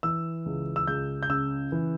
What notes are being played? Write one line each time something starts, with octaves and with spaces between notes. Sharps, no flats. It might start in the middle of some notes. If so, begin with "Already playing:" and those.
E3 E6
C#2
E6
C#2 G6
G6
C#3 E6
E3